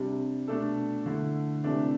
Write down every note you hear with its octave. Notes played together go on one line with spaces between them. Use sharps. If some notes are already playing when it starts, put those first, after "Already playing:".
Already playing: C3 G3 D4
B2 A3 D4 A4
D3 A3 E4
C3 E3 A3 D4